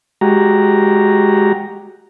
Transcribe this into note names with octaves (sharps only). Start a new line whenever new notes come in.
G#3 F#4 G4 A#5